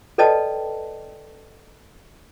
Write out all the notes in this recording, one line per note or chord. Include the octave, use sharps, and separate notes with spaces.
A4 B4 D5 D#5 G5 A5